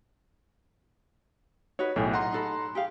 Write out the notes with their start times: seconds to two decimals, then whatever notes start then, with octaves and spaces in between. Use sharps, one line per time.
1.79 D#4 F#4 B4 C#5
1.96 B1 A2 F4 G#4 G5
2.13 D#5 F#5 A#5 C6
2.32 D#4 A4 B5
2.75 G4 G#4 F5